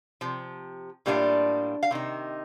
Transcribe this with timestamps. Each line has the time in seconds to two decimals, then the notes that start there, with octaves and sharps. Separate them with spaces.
0.21 C3 F3
1.06 A2 G3 A#3 D4 F4
1.83 F5
1.91 C3 D#3 D#4